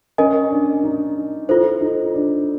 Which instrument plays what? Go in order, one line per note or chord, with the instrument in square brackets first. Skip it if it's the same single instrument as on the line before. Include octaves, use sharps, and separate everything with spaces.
[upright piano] C#4 [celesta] A#4 D#5 G#5
[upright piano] D4
D#4
[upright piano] E4 [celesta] F4 A4 C5
[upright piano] D#4
D4